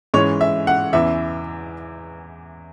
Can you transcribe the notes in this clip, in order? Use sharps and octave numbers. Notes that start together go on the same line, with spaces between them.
G#2 E3 G#3 C#4 C#5
E5
F#5
E2 C#3 E3 E5